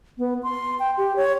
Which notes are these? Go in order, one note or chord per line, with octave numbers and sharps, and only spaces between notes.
B3
C6
G5
G4
C#5